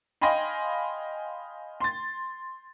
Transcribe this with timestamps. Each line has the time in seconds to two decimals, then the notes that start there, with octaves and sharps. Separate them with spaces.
0.22 D#5 F5 G5 G#5 B5 C6
1.81 C6 A6